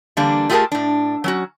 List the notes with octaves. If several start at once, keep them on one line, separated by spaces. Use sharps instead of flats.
D3 E3 G3 A#3 D4
A3 F4 G4 G#4 A#4 A5
A2 D4
F#3 C#4 F#4